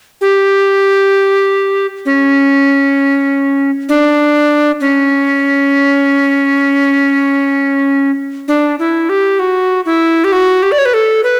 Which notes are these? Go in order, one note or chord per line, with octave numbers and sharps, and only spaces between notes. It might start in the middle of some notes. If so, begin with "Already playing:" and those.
G4
C#4
D4
C#4
D4
E4
G4
F#4
E4
G4
F#4
G4
D5
C#5
B4
A4
B4